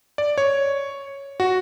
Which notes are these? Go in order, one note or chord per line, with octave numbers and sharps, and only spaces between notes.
D5
C#5
F#4